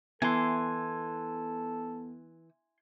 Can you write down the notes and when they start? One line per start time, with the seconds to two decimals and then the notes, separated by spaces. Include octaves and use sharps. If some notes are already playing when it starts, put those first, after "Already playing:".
0.22 E3 B3 A4 G#5 C6